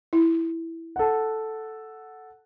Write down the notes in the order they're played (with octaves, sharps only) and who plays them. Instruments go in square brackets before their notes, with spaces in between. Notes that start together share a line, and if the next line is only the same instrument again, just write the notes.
[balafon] E4
[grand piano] A4 F#5